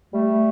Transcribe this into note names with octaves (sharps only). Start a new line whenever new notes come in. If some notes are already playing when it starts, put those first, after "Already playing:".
G3 A3